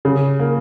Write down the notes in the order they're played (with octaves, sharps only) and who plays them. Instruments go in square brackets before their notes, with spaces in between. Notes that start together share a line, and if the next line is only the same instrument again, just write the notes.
[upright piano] C#3
A#3